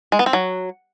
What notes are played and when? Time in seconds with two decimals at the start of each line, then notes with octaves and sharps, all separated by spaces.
0.12 G#3
0.19 B3
0.26 C4
0.33 F#3